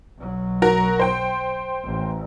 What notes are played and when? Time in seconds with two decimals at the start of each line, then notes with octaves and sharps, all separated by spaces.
0.18 B1 F#3
0.62 F#4 A#4 A#5
0.99 C5 G5
1.84 A1